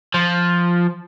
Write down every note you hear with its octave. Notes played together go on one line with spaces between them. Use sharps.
F3